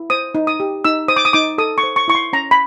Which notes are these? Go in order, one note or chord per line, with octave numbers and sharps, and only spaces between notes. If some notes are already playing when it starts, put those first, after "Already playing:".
Already playing: E4
C5 D#6
D#4
D#6
G4
D#4 E6
C5 D#6
D6
D#6
D#4 D6
A4 D#6
C#6
C5
C#6
E4 C#6
C6
C#4 A#5
B5